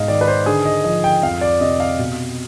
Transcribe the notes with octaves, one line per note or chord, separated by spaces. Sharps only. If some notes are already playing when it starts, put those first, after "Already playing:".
Already playing: G#2 B2 G#3 D#5 F5
D#3 D5
B4
C5
D3 G#4
D#5
F3 D#5
G5
F2 F5
D5
C3 D#5
F5
B2